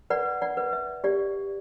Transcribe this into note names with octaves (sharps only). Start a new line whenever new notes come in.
B4 D5 F#5
D5 F#5
B4
E5
G4 D5